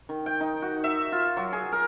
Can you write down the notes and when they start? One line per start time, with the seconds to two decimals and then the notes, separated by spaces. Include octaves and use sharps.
0.09 D#3
0.26 G5
0.40 D#4
0.62 F#4
0.84 E5
1.12 F4
1.37 F#3
1.53 G#4
1.72 A#4